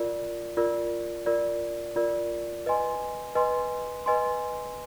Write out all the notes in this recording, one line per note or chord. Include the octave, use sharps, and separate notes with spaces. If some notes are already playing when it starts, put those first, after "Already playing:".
Already playing: F4 A#4 D5
F4 A#4 D5
F4 A#4 D5
F4 A#4 D5
B4 D#5 G#5 C6
B4 D#5 G#5 C6
B4 D#5 G#5 C6